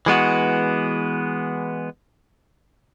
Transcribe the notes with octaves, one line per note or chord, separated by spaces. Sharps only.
E3 G#3 B3 F#4